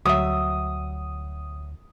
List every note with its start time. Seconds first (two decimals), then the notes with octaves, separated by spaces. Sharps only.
0.05 D2 F#3 E5 D#6